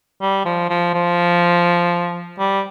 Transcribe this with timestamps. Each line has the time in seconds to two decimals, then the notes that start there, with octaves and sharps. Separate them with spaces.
0.22 G3
0.46 F3
0.70 F3
0.94 F3
2.39 G3